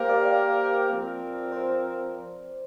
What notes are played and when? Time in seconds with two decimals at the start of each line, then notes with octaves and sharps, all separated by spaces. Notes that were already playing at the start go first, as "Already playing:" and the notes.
Already playing: A#3 G4 A#4 C5 F5 G5
0.09 D5
0.19 F5
0.25 D5
0.89 F3 C4 A#4
1.52 C5